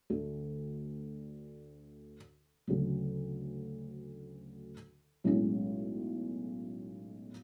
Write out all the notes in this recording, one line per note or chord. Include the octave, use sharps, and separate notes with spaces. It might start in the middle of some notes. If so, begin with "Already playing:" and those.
D2 D3 A3
D2 C#3 F#3
B1 A2 G#3 C#4 E4